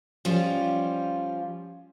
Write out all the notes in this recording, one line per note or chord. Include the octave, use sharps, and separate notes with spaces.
F3 G3 C#4 F4